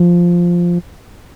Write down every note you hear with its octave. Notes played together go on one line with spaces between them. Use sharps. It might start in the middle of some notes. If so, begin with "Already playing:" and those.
Already playing: F3